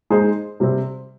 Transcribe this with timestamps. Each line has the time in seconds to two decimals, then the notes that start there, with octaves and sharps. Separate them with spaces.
0.10 G#3 D#4 G#4 C5
0.60 C3 G3 C4